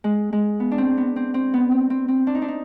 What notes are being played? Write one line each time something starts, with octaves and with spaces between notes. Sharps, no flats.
G#3
G#3
B3
D4
C4
B3
C4
C4
B3
C4
C4
C4
D4
D#4
D4
D#4